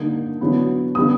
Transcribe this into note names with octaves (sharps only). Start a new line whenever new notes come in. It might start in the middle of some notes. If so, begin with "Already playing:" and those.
Already playing: D3 G3 A#3 D#4
D3 F#3 B3 E4
D3 G3 B3 D#6